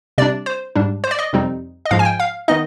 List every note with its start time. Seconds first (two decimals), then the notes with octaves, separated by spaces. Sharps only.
0.18 C3 G3 D4 D5
0.46 C5
0.76 G#2 G3 D4
1.04 C5
1.11 D5
1.19 D#5
1.33 F2 C3 G3 C4 D#4
1.86 D#5
1.91 G#2 F3 G#3 F5
1.99 G#5
2.05 G5
2.20 F5
2.48 D#3 B3 D#4 D#5